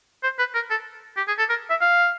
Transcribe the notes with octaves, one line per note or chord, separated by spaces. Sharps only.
C5
B4
A#4
A4
G4
G#4
A4
A#4
E5
F5